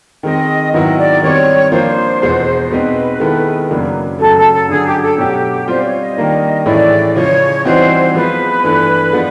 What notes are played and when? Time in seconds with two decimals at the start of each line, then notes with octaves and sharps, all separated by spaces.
0.23 D#3 G#3 C4 D#5
0.73 G#2 D#3 F#3 B3 E4 D#5
0.98 D5
1.22 D#3 G3 C4 C#5
1.72 F3 A#3 D4 C5
2.22 E2 B2 G#3 B3
2.70 B2 G#3 C4 D#4 B4
3.20 D#3 G#3 B3 E4 A4
3.70 F#2 C#3 F#3 A#3 D4
4.19 F#2 C#3 F#3 A3 A4
4.36 A4
4.53 A4
4.68 G2 D3 F#3 G#4
4.85 G4
5.02 A4
5.17 B2 F#3 A3 C#4 F#4 G4
5.67 G3 C4 F4 C5
5.84 C#5
6.01 D#5
6.17 D#3 G3 A#3 D4
6.66 A2 E3 G#3 C#4 E4 D5
7.16 C#3 F3 G#3 C#4 C#5
7.65 E3 G3 C4 D#4 F#4 C5
8.15 F3 G#3 B3 B4
8.64 G2 E3 A3
9.13 F3 G#3 B3 D4